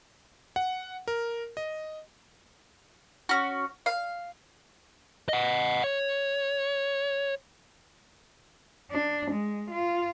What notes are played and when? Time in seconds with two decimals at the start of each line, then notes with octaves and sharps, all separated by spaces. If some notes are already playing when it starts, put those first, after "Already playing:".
0.56 F#5
1.08 A#4
1.57 D#5
3.29 C#4 F#4
3.86 F5
5.29 D#5 F#5
5.84 C#5
8.91 D4
9.32 G#3
9.71 F4